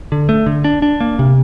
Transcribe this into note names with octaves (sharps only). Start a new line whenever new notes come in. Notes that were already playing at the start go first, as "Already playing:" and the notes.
D3
A3
D3
D4
D4
A#3
C3